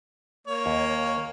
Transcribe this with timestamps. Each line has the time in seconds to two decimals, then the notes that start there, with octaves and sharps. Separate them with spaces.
0.47 A#3 C#5
0.66 D#2